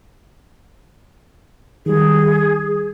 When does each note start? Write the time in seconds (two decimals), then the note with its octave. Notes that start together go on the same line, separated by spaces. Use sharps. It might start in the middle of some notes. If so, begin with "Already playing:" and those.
1.86 D#3 G3 G#4